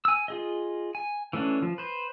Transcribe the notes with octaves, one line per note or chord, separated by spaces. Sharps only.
G#5 E6
F4 G#4 D#5
G#5
E3 A3 C#4 D4
F3
B4 C5